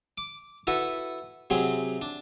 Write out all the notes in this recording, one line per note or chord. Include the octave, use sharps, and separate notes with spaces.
D6
E4 F#4 A4 B4
C3 F#3 C4 G#4
D4